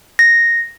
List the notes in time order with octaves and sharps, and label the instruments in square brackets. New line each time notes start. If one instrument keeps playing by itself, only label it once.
[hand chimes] A#6